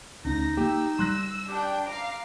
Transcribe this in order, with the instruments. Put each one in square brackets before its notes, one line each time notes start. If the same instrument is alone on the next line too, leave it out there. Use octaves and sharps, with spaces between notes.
[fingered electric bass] D2 C#4 [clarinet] D#4 [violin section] A#6
[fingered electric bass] A#3 [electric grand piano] G4 [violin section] E6
[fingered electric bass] G3 [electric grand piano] C6 F#6 A#6
[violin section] D4 G5 [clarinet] G4
[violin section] F5 A#5 [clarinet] D6